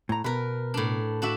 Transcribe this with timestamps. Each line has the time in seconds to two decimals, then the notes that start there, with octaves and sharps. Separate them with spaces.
0.09 A2 A#5
0.24 B2 A#4 B4
0.74 A2 D4
1.22 D4 F#4 E5